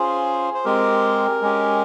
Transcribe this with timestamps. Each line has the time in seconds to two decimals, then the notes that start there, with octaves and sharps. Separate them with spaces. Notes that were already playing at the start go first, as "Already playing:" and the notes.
Already playing: C#4 F4 G#4 C5
0.54 C5
0.65 G#3 C4 G4 A#4
1.42 G#3 C#4 G4